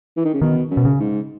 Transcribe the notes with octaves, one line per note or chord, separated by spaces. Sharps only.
E3
D#3
C#3
B2 D#3
F#2
B2
C#3
G#2